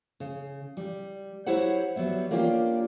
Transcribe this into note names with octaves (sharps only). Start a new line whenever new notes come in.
C#3
G3
F#3 E4 G4 C5 C#5 F#5
F#3 G3 B3 E5
A#3 C#4 D4 F4 G4